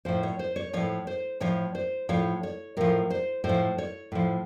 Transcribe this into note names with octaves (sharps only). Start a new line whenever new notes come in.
A2 F3 C5
C#5
C5
C#5
A2 F3 C#5
C5
A2 F3 C#5
C5
A2 F3 C#5
C#5
A2 F3 A#4
C5
A2 C5
F3
C#5
A2 F3